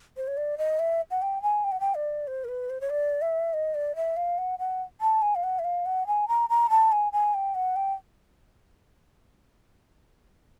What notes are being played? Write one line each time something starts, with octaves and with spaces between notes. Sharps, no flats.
C5
C#5
D5
D#5
E5
F#5
G5
G#5
G5
F#5
G5
D5
C5
A#4
B4
C5
C#5
D5
E5
D#5
D5
E5
F5
F#5
F#5
A5
G#5
F5
F#5
E5
F5
F#5
G#5
A#5
A#5
A5
G#5
G#5
G5
F#5
G5